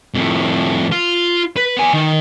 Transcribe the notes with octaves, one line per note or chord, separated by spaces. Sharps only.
F2 A2
F4
B4
B3 G#5
D#3